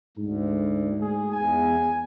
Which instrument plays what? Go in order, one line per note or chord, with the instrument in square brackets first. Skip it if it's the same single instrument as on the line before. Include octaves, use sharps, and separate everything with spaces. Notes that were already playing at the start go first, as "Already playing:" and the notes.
[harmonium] D2 [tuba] G#2
[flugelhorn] G#4
[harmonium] E2 [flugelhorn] G#5